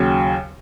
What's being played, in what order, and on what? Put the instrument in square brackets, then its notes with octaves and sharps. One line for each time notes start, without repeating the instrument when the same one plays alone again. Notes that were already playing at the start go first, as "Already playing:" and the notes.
Already playing: [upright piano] D#2 C#3 F#3